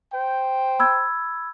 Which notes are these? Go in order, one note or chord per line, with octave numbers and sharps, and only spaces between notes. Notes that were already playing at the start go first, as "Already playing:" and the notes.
C5 G5
B5 E6 G#6